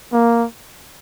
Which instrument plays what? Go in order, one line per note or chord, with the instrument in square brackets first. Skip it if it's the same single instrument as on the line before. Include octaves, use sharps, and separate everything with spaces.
[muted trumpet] A#3